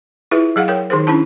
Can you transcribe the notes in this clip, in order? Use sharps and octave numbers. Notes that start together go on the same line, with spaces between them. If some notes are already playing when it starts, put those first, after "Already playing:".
E4 F4 G#4 B4 E5
F#3 G#4 F5 F#5
A#4 C#5 G5
D#3 D#4 G#4 A#4 C5
C#4 D4 E4 A5